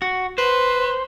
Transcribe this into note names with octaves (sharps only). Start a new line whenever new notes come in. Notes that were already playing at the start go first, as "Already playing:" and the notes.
F#4
B4 C5